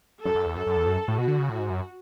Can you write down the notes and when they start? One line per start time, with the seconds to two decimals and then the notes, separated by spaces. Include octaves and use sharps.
0.25 F#2 A4
0.35 F#2
0.46 E2
0.56 F#2 A4
0.67 F#2
0.77 E2
0.86 F#2
1.08 A2
1.18 B2 F#4
1.28 D3
1.39 C#3
1.49 A2
1.59 G#2
1.70 F#2